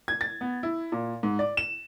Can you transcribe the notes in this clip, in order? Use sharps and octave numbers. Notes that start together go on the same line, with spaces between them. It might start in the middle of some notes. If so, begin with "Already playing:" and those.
G#6
A6
B3
E4
A#2
G#2
D5
E7